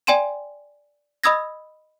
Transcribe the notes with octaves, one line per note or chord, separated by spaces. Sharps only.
D5 G5 G#5 C6 D#7 E7
D#5 B5 D#6 E6 G#6 A#6